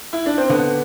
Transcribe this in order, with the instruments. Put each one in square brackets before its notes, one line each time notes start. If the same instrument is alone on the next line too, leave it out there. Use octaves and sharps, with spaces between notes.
[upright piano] E4
D4
C4
[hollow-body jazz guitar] D3 [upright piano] B3